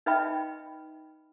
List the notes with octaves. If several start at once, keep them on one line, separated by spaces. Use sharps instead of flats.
D#4 B4 D#5 E5 G5 B5